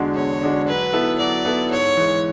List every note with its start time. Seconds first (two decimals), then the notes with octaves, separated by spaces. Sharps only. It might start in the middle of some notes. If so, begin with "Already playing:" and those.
Already playing: E2 D3 G#3 D4 F#4
0.15 E2 C#5
0.41 D3 G#3 D4 F#4
0.67 F#3 B4
0.93 B3 E4 A4
1.19 F#3 D5
1.45 B3 E4 A4
1.71 G#2 C#5
1.97 E3 G#3